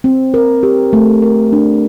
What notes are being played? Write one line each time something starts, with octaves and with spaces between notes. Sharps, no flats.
C4
A#4
G4
A3
A#4
D4